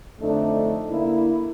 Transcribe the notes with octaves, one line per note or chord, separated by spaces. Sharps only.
F2 D3 A3 D4 D#4
D3 A#3 E4